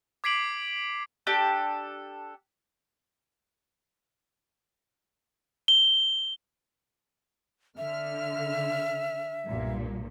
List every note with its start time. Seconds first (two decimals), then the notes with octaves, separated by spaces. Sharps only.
0.24 D6 G#6 B6 C7 D7 F#7
1.27 D4 G4 A4
5.68 G7
7.78 D3 E5 F6
9.47 B1 G2 A#2